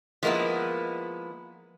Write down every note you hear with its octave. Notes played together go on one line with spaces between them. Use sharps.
F3 G#3 A#3 B3 E4